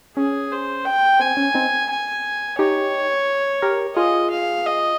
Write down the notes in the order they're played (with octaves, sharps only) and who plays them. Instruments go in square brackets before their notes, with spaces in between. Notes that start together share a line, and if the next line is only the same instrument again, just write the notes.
[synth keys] C#4 [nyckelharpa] G#4
[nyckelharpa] C5
G5
[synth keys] C4 [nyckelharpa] G#5
[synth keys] C#4
C4 D#4
[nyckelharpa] G#5
[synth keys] D#4 G4 [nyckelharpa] C#5
[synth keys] G4 A#4
[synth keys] F4 G#4 [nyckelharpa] D#5
[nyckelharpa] F5
D#5